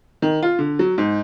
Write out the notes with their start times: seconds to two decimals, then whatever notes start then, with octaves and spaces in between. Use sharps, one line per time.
0.22 D#3
0.43 F4
0.59 D3
0.79 F#3
0.98 G#2